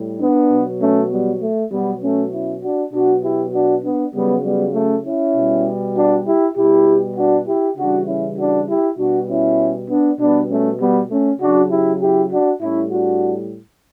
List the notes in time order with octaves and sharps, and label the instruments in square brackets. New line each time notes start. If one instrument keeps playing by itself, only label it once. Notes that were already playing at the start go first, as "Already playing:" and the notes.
Already playing: [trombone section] A2 G3
B3 D4
B2 F#3
A3 C#4
G3 B3
A3
B2 F#3 G3 B3
A3 C#4
C#4 E4
D4 F#4
B2 F#3 D4 F#4
E4 G4
D4 F#4
B3 D4
C#3 F#3 G3 B3
G3 B3
A3 C#4
C#4 E4
B2 G3
D4 F#4
E4 G4
B2 G3 E4 G4
D4 F#4
E4 G4
C#3 E3 G3 D4 F#4
C#4 E4
D4 F#4
E4 G4
B2 G3 D4 F#4
C#4 E4
B3 D4
B2 G3 B3 D4
A3 C#4
G3 B3
A3 C#4
C#3 F#3 D4 F#4
E4 G4
E4 G4
D4 F#4
A2 G3 C#4 E4
D4 F#4